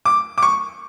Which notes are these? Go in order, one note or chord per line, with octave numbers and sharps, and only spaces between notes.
D6
D6
C#6